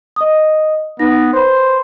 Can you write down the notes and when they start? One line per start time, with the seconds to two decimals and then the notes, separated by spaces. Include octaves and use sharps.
0.16 D#5 D#6
0.99 B3 D#4 A#6
1.33 B4 C5 B5